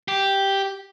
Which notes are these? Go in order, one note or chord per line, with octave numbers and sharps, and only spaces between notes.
G4